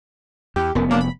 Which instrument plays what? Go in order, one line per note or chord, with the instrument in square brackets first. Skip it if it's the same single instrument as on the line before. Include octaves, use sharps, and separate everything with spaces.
[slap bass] E2 [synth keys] G4
[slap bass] F1 B3 [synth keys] F#2
[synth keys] F#3 A#3 D4
B5